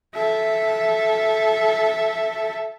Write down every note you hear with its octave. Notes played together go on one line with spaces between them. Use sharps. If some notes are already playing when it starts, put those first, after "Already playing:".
A4 E5